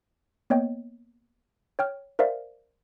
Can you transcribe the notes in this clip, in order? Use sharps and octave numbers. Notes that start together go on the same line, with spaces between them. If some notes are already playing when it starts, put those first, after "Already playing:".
A#3 B3 C#5 D#5 G5
C#5 G5 F6
A#4 C5 D5 E5 F5